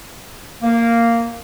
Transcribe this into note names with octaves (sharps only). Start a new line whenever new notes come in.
A#3